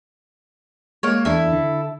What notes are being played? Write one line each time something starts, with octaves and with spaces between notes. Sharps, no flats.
G#3 A#3 C#5
E2 D4 E4 A4
D3